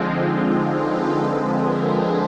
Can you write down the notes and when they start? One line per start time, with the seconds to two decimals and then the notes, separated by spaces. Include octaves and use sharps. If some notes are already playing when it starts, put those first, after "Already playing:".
Already playing: D3 F3 G#3 C4 D#4 F4
0.71 A4 B4
1.15 A4 B4
1.45 G#4 A#4
1.75 A4 B4